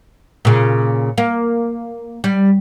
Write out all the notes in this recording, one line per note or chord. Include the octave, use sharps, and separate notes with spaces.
A#2 C#3
A#3
G3